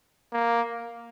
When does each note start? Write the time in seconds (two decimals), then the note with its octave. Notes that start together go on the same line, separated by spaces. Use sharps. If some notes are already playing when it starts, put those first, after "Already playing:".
0.33 A#3